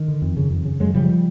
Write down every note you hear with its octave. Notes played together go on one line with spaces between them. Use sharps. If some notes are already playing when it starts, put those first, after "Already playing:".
Already playing: D#3
D3
F2
C#3
F2
C#3
F#2 F#3 G#3
C#3 F3 G3